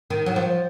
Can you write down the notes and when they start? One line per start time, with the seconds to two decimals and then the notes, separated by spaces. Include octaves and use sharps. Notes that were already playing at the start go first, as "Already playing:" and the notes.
0.10 D#3
0.26 F#3
0.36 F3